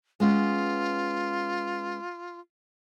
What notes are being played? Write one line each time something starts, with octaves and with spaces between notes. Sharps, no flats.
G#3 B3 C#4 F4